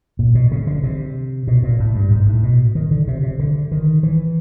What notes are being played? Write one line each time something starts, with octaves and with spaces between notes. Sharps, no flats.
A#2
B2
C#3
D3
C3
B2
A#2
A2
G2
G#2
A2
B2
D#3
D3
C3
C3
D3
D#3
E3